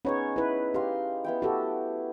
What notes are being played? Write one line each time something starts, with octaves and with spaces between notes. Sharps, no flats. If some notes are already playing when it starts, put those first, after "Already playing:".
B3 C#4 D#4 G#4 C#5
E4 B4
G4 D#5 F5 C6
B3 E4 G5
F#4 G4 A4